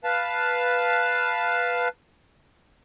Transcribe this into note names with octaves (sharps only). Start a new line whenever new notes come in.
B4 F5 A5